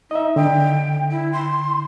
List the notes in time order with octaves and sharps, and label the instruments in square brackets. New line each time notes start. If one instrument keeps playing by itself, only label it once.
[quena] D#4 [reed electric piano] D#5 E5
[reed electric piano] D3 [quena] G5
[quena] E4
C6